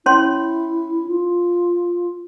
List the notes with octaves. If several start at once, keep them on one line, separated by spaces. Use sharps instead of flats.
C#4 E4 C#5 C6
F4